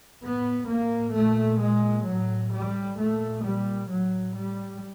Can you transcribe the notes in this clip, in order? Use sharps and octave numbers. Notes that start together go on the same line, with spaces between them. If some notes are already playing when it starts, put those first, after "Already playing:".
A2 B3
A#3
A#2 A3
G#3
A2 F#3
G3
A#2 A3
G3
A2 F#3
G3